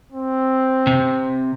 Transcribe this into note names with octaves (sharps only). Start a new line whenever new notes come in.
C4
C3